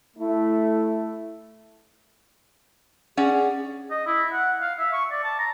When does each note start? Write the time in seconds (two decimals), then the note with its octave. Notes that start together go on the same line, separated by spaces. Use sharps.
0.17 A3 E4
3.17 C#4 G#4 D5 F#5
3.91 D#5
4.06 E4
4.32 F#5
4.61 F5
4.79 E5
4.93 C#6
5.11 D5
5.24 A5
5.39 A#5